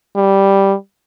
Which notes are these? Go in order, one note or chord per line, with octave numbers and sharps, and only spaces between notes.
G3